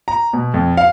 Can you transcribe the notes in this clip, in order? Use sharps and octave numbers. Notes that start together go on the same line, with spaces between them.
A#5
B2
F2
F5